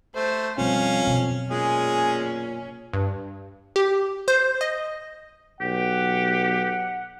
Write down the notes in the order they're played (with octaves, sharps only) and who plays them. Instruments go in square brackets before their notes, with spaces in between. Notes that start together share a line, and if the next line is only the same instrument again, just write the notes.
[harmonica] A3 [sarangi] C5
[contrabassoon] F2 [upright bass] B2 G3 [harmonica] C#4 [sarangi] F5
[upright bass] F#2 B2
[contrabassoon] A#2 [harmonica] G#3 G#4 [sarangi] C#4
[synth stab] G2
G4
C5
D#5
[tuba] B1 [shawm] G4 [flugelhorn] F#5